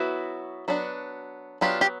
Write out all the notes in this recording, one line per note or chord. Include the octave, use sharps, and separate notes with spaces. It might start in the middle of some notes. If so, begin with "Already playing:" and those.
Already playing: F#3 B3 E4 F#4
F#3 B3 D4
F#3 B3 D4 F4 G4
G4